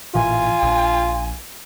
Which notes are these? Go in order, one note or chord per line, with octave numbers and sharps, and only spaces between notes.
A1 A#2 E3 F4 G#5
A#1